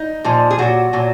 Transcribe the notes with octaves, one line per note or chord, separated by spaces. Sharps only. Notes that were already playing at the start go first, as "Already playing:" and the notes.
Already playing: D#4
A#2 F3 G#3
G#4
A#2 F#3 F#4
A#2 F#3